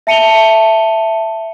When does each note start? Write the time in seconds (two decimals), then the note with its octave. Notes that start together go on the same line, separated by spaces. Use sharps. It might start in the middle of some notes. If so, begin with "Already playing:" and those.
0.07 E5 A5 C#7 D#7 F7 G7